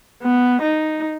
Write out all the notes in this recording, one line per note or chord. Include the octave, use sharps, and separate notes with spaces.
B3
D#4